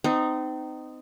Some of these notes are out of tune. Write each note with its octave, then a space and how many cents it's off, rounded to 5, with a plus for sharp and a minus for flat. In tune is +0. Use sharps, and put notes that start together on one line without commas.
C4 -35 D#4 -10